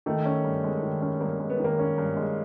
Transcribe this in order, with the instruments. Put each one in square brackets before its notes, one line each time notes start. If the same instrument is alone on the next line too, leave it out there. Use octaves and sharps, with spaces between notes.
[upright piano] D#3 [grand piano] A3
[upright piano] C#4
G2
G#3
D#3
C#4
[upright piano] G2 [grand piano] A#3
[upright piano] G#3
[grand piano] B3
[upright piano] D#3 [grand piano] A#3
[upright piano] C#4
G2
G#3